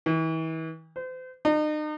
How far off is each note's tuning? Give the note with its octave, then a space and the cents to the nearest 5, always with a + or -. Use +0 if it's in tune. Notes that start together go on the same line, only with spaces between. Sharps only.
E3 -40
C5 -35
D#4 -40